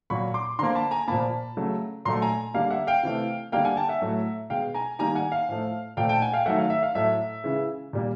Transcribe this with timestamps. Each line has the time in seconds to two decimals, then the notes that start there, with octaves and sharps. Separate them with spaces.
0.10 A#2 F#3 A#3 B5 C#6
0.34 C6 D6
0.59 D3 F3 A#3 A#5 C6
0.75 A5 B5
0.91 G#5 A#5
1.08 A#2 F3 A#3 A5 B5
1.57 C#3 F#3 A3
2.05 A#2 F#3 A3 A#5 C6
2.22 G#5 A#5
2.54 D3 G3 A#3 F5
2.71 E5 F#5
2.87 F5 G5
3.03 C3 E3 A3
3.52 D3 G3 A#3 F5 G5
3.65 F#5 G#5
3.77 G5 A5
3.89 E5 F#5
4.02 A2 F#3 A3
4.50 B2 G#3 F5 G5
4.74 G#5 A#5
4.99 D#3 G3 A#3 G#5 A#5
5.15 F#5 G#5
5.32 F5
5.48 A2 F3 A3
5.97 A#2 F3 A3 F5 G5
6.09 G5 A5
6.22 F#5 G#5
6.34 F5 G5
6.46 D#3 F#3 A3 E5 F#5
6.59 F5
6.70 E5
6.83 F5
6.95 A2 F#3 A3 E5
7.44 C#3 E3 G#3
7.93 A#2 G3 A#3